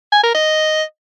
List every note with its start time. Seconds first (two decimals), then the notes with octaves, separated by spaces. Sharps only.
0.12 G#5
0.23 A#4
0.35 D#5